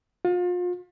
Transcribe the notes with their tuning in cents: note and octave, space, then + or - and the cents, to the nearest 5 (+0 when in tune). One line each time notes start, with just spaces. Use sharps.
F4 +35